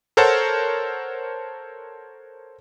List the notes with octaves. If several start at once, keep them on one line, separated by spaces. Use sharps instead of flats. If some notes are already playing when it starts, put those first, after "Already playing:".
A4 A#4 C5 C#5 F#5 A5